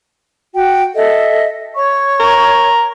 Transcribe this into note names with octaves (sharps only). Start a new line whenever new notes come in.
F#4 G5
A4 D#5 E5
C#5 C#6
A#4